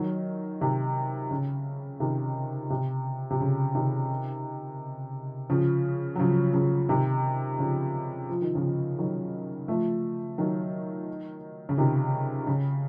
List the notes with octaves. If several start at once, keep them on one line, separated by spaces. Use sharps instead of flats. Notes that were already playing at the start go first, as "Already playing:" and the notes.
Already playing: D#3 F#3
C3 D#3
C#3
C3 D#3
C3
C3
C#3
C3 D#3
C#3 F3
F#3
C#3 F3
C#3 F3
C3 D#3
C#3 F3
F3
D#3
C#3 F3
D#3 F#3
F3 A3
D#3 F#3
C#3
C3 D#3
C#3